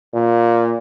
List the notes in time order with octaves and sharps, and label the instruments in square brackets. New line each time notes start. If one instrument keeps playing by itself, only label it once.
[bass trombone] A#2